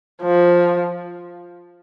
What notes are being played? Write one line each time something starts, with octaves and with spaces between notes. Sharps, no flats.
F3